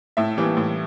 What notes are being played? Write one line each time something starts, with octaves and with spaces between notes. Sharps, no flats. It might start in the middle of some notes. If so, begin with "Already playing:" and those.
A2 E5
E3 G3 A#3
A2